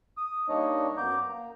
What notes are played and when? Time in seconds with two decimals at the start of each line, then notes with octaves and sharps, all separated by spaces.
0.17 D#6
0.49 G3 A#3 D4 D#4 C#5 D#5
0.97 F#2 B3 A#5 D6 G6
1.29 A#3 A#5